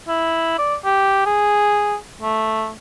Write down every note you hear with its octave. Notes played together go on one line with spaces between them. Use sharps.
E4
D5
G4
G#4
A3